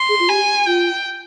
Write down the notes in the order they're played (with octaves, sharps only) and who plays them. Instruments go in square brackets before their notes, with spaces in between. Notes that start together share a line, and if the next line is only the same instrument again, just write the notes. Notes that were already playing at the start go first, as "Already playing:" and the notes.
Already playing: [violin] C6
[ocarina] G#4
F4
[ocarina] G4 [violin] G#5
[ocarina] F4 [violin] G5